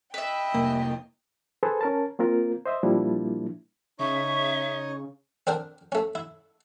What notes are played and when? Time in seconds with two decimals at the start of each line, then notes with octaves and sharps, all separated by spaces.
0.14 B4 D#5 E5 G5
0.54 F1 C2 A#3
1.63 G#4 A4 B4 C5
1.81 C#4 A#4 A5
2.19 A#3 C4 F4 A#4
2.66 C5 D#5 E5
2.83 A#2 F3 G3 A#3 D4 E4
3.99 C#3 D#4 C#5 D#5 E5 C#6
5.47 C4 D4 A#4 G5
5.92 A3 C#4
6.15 E4